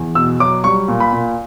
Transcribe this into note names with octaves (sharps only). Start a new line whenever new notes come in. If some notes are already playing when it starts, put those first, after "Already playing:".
Already playing: E2
B2 E6
F#3 D6
G3 C#6
A#2
B5
A#2